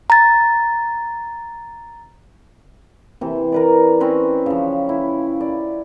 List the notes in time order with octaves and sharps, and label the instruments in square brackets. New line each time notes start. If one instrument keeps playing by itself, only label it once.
[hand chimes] A#5 A6
[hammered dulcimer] C3 E3
A#4 B4 D5
C4 C#4 B4 C#5
C#3 F3
E4
D5